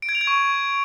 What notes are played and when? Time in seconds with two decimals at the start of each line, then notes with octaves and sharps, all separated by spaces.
0.02 D7
0.09 G#6
0.15 F7
0.21 G#6
0.27 C#6